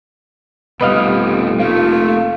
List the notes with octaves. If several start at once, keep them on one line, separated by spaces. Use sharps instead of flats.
F1 B2 G3 B4 D#5 F5
A3 A#3 F4